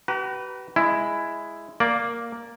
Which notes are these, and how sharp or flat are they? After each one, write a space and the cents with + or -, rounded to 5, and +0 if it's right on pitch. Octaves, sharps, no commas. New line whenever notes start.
G4 -45 B4 +0 A#5 +0
G#3 +0 E4 +10
A#3 +0 D5 +0